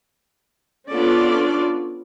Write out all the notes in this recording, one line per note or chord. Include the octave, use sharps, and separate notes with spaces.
B3 C#4 D4 F4 A4 D5